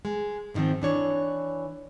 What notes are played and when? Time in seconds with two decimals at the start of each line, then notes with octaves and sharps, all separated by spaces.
0.05 G#3
0.54 G#2 D3 D#3 F3 C4
0.82 E3 D4 C#5